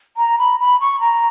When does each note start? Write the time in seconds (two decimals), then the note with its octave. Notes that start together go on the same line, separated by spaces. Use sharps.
0.16 A#5
0.39 B5
0.59 B5
0.80 C#6
1.00 A#5